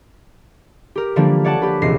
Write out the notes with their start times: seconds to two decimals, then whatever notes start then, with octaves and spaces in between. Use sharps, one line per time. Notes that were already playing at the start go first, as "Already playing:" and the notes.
0.95 G4 A#4
1.16 D3 F3 G3 A#3 D4
1.44 C#5 D5 F#5 A5
1.62 G4 B4
1.82 E1 C#2 A#6 C7